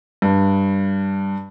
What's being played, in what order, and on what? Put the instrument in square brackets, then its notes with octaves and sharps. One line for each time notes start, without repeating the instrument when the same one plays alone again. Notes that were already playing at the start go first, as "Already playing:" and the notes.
[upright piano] G2